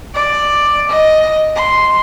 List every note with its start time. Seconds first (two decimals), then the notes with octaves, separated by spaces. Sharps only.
0.15 D5
0.89 D#5
1.56 C6